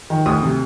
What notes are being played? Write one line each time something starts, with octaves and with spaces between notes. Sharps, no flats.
D#3
D2 D#6
C3